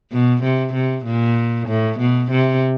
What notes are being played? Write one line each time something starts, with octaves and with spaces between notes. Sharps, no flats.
B2
C3
C3
A#2
A2
B2
C3